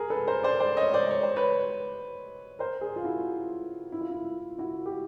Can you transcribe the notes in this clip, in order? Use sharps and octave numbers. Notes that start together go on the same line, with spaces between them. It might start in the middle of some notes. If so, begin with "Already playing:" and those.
Already playing: G#4 A#4
A4 B4
A#4 C5
C5 D5
C5 D5
C#5 D#5
C5 D5
C#5
C5
B4 C#5
A#4 C5
G#4 A#4
F4
E4 F#4
E4
F4
E4
E4 F#4
G4
F#4